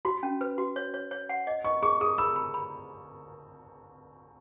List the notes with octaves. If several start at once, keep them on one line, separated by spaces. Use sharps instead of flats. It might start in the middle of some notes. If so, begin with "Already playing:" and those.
F#4 B5
C#4
B4
F#4
C#5
C#5
C#5
F#5
D#5
D#5 C#6
G#4 C#6
G#4 D#6
B5 E6
B5
B5